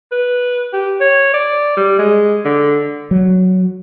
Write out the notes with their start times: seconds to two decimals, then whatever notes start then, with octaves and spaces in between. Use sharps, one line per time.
0.12 B4
0.73 G4
1.00 C#5
1.34 D5
1.77 G3
1.99 G#3
2.45 D3
3.11 F#3